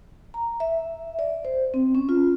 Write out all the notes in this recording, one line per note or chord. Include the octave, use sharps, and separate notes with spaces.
A#5
E5
D5
C5
C4
C#4
F4